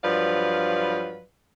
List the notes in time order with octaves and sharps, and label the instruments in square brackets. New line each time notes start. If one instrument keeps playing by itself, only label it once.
[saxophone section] G2 F3 F#3 B4 D5 F5